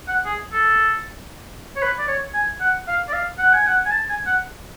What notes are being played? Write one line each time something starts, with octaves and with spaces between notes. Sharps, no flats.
F#5
G#4
A4
C#5
B4
D5
C#5
G#5
F#5
F5
D5
F5
F#5
G#5
F#5
G#5
A5
G#5
F#5